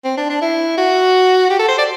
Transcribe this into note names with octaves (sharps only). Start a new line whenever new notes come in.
C4
D4
D4
E4
F#4
G4
A4
C5
D5